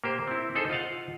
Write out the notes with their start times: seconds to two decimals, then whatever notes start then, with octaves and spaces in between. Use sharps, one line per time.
0.04 A#3 G4 C5
0.27 C4 E4
0.55 D#4 G#4 A4 C5
0.70 F4 D#5 F5 F#5